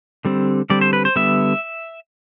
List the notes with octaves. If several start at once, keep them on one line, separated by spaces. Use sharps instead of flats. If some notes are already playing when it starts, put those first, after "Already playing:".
D3 G3 C4
D3 G3 C4 D5
C5
B4
C5
D3 G3 B3 E5